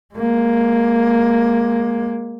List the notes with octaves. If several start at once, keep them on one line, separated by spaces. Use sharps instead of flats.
G#3 A#3